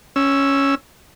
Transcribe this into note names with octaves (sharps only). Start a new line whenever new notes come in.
C#4 E6